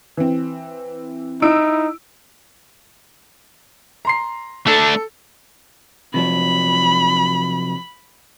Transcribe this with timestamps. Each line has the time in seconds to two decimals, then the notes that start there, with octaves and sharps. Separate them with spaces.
0.17 E3 C4
1.42 D#4 E4 E6 D7
4.05 A#5 C6 C7
4.67 A3 D4 A4
6.14 C3 F3 F#3 B5